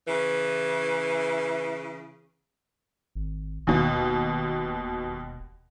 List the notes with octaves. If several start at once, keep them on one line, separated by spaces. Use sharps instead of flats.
C#3 E3
G#1
E1 D#2 B2